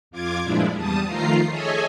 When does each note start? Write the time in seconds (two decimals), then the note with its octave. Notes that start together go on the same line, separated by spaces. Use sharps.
0.11 F2 F4 D6 G#6
0.43 G2 A#2 F3 G#3 D4 E4
0.74 E2 G3 A5 D#6
1.06 D#3 F3 A3 F4 A#5 C7
1.50 G#4 A4 C#5 D#5 E5 G#5